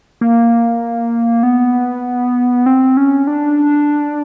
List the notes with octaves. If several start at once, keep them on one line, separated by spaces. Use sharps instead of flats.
A#3
B3
C4
C#4
D4